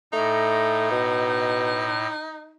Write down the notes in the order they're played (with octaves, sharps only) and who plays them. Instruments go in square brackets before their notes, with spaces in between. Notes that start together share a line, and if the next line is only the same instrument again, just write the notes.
[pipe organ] A2 [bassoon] A3 [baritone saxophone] D#4
[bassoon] B2